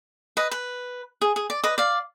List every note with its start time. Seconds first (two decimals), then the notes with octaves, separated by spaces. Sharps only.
0.37 B4 D#5
0.51 B4
1.22 G#4
1.36 G#4
1.50 D5
1.64 B4 D#5
1.78 D5 F5